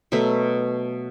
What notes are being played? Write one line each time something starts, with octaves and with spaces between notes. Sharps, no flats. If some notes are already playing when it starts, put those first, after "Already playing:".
B2 F#3 A3